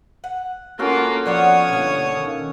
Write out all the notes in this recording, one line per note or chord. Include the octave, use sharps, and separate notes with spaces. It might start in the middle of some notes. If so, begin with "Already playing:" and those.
F#5
A#3 C#4 F4 F#4 A4
F3 B3 F4 C#5 D5 F#5 D#6
G1 B2 A#3
D#3